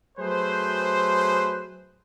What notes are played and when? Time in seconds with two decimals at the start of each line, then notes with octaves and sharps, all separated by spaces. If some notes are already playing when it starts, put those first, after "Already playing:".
0.18 F#3 A3 G#4 B4 C5